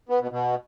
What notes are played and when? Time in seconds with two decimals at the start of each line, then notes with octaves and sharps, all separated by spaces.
0.09 B3
0.20 B2
0.31 B2